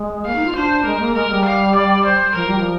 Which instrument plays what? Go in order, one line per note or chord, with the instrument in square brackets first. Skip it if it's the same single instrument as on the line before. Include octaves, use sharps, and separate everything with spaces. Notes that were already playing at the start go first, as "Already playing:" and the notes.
Already playing: [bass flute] G#3
[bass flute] A#3 [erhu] F5
[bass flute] D#4
F4
[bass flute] D4 [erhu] C5
[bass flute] G#3 [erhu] A#4
[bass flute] A#3
[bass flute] G#3 [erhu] A#4
[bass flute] G3
[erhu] F5
D5
C5
[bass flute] F3 [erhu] A#4
[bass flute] G3
F3